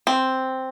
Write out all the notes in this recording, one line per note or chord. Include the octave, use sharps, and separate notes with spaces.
C4